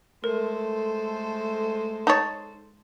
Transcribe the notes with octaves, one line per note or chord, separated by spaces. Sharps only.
G#3 A3 A4 A#4 C5
D#4 C#5 A5 D#6 A6